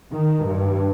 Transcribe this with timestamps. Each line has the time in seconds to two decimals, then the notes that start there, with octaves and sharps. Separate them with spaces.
0.14 D#3
0.46 G2